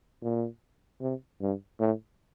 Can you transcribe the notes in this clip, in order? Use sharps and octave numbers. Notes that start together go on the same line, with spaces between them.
A#2
C3
G2
A2